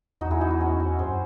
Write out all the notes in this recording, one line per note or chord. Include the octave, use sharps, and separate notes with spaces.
E2 D#4 F#4
E4 G#4
D#4 F#4
E4
C#4
C#4
F#2 G#4 C5